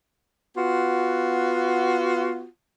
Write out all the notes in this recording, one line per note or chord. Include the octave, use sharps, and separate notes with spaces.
B3 F4 F#4